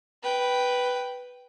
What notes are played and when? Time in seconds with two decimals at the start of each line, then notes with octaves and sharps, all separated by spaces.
0.22 B4 G5